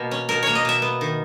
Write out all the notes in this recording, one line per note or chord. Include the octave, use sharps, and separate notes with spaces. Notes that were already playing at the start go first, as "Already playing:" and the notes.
Already playing: B2 A#3
C#4
B2 A#4
A#3 C#5
D#5
B2 E5
B3
D#3